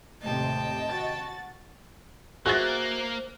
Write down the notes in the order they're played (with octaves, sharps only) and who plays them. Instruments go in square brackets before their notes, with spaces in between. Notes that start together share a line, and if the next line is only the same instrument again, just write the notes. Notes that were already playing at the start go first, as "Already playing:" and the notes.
[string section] D#2 A2 C3 [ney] D#5 [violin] G5 A5
[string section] F#4 A6
[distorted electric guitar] A#3 [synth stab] F#4 G#4 E5 [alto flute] C5 [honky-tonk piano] F#6 A6